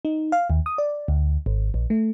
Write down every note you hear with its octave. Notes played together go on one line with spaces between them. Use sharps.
D#4
F5
D#2
D#6
D5
D2
G#1
A#1
A3